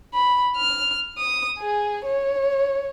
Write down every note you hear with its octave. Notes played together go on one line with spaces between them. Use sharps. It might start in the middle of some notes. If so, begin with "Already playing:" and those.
B5
F6
D#6
G#4
C#5